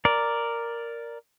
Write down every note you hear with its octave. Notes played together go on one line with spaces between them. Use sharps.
A#4 D5